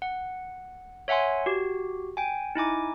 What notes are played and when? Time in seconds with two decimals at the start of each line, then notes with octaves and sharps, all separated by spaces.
0.02 F#5
1.08 C#5 E5 F#5 G#5 C6
1.46 F#4 G4
2.17 G5 G#5
2.55 D#4 E4 G#5 D6